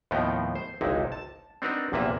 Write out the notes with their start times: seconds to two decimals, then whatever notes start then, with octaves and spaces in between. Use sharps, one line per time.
0.11 D#2 A2 F3 B3 D#4 G5
0.55 C5
0.81 G#1 C#2 C3 D#4 E4
1.12 A5
1.62 C4 D4 D#4 F#4 A#4 B4
1.92 A#1 E2 C3 A#3 B4 E5